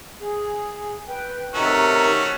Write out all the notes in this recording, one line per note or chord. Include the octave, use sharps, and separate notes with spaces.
G#4
B4 G5
C3 D#3 A3 C#4 D#4 F#4